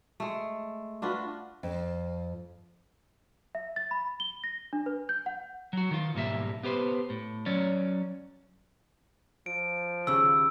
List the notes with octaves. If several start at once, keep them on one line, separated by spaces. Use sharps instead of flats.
G#3 A3
D4 F4 F#4 B4
F2
E5
A6
B5
G7
A#6
D4
B4
G6
F#5
F#3 F#4
D#3 F4
B1 G#2 G3 A#3 E5
B3 G4 B4 C5
A2
F#3 C#4 C#5 D5
F3 D7
D#2 C#3 E6